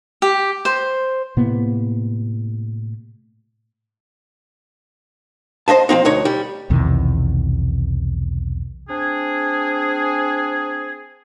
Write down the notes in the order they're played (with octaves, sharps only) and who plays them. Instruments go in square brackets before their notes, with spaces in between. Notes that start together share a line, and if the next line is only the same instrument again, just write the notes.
[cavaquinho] G4
C5
[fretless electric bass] A2 C3 A#3 B3
[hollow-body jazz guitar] C5 D#5 E5 A5
F3 F#3 C4 D#4
D2 D#4 C#5
G3
[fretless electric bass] B1 E2 C3 D#3
[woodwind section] C4 D4 G#4